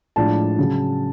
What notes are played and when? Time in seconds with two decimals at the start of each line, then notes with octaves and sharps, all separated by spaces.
0.16 A2 F3 G#3 D4 A5
0.58 C#3 F#3 C#4